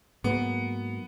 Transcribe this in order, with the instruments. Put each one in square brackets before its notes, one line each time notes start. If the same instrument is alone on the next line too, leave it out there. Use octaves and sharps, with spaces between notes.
[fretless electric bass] G#2 F#3 A#3 [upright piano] B3